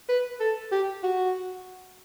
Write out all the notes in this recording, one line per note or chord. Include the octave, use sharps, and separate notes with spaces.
B4
A4
G4
F#4